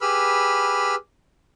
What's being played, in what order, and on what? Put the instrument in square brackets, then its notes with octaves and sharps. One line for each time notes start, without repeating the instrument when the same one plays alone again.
[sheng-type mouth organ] G4 G#4 B4 B5 E6 F6